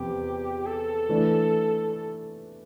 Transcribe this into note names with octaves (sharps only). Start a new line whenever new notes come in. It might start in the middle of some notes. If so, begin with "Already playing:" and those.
Already playing: E2 C3 F3 B3 G4
A4
E3 A3 D4